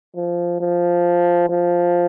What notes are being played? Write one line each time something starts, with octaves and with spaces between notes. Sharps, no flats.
F3
F3
F3